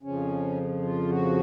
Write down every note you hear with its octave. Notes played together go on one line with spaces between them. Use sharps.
F2 C#3 F3 C#4
F4
F#4